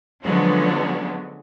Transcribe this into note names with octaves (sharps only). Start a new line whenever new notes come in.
D3 F3 F#3 G#3 B3 C#4